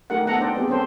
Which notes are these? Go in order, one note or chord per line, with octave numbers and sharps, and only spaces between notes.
A3 D#4 G4 A#4 F#5
B3 A4 F#5 A#5
D4 D#4 C5 D5 G5
B3 C4 G4 G#4
C4 C#4 G4 A4 C5